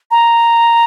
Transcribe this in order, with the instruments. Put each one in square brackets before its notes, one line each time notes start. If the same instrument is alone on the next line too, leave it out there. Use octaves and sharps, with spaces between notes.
[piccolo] A#5